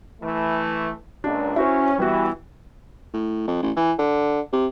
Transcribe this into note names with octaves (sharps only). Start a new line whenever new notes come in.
E3 A3
C#2 A#2 D4
C#4 E4 F#4 C5
E3 G3 B3 F#4
A2
F2
A1
E3
D3
C3